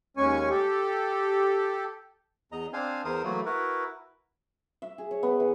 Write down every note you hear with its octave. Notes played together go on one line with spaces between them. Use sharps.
D#2 G#3 C#4 G#5 C#6
G4 A4
E2 D#5 A#5
C4 D4 C5 F5 G#5
E2 E3 A#4 C5 D#6
E3 F#3 A3 A#3
E4 F#4 A#4 B4
E5
G#4
C#5
B3
E3